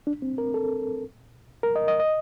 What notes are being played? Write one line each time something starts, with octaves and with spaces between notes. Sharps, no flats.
D4
C4
A#4
A4
A#4
D#5
D#5
D#5